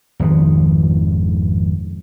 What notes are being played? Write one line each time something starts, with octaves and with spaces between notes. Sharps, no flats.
G#1 F2 B2 D#3